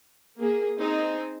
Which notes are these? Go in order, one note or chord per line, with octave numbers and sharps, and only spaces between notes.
A#3 G#4
C4 D#4 G#4